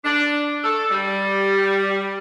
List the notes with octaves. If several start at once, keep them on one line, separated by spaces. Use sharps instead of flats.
D4
A4
G3